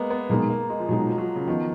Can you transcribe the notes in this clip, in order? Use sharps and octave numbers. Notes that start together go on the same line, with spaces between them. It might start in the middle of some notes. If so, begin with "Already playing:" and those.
Already playing: G#3 A#3 B3
B3
B2 G#3 A#3 D#4
A#3
G#3
F3
B2 F#3 G#3 D#4
F3
F#3
C#3
D#3 F3 B3